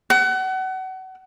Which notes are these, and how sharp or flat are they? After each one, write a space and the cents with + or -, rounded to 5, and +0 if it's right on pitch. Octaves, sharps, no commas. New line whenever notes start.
F#5 +30